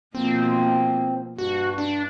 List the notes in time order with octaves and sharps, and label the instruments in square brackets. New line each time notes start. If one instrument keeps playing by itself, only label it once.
[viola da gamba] B2 F3 A#3 [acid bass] C4
[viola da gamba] G2 [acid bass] F#4
[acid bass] D4